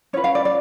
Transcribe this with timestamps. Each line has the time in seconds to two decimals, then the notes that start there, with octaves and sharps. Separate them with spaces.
0.13 C#4 F4 B4 C#5
0.24 F5
0.35 D5
0.45 D5